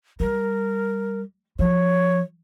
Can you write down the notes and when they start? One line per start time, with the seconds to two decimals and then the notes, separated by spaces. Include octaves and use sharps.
0.20 G3 A#4
1.59 F3 C#5